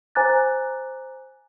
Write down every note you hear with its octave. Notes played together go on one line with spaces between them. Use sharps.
C5 G#5 A#5 D6 F#6 A6